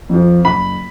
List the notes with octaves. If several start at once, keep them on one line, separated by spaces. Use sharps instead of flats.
F2 F3
F#1 B5